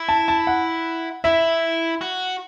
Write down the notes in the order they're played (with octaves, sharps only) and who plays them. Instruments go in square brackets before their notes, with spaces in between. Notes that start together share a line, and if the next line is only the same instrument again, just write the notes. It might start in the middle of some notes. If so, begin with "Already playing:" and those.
Already playing: [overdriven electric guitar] E4
[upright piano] A5
A5
F#5
[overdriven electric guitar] E4 [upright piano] E5
[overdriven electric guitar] F#4